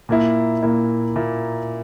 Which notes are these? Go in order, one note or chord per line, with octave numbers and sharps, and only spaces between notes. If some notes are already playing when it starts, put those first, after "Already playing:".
A#2 A#3 E4
A#2 A#3 E4
A#2 A#3 E4